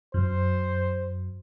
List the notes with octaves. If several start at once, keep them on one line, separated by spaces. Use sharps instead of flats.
F#2 C5